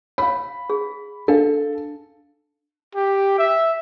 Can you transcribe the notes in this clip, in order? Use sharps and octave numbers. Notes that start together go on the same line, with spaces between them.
C#5 F5 B5
G#4
D4 A4 F5
G4
E5